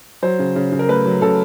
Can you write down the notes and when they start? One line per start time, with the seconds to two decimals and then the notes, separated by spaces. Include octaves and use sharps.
0.22 F#3 C5
0.39 C#3
0.56 C#3
0.72 C#3
0.79 A#4
0.89 A3 B4
1.06 F#3
1.21 C#3 A4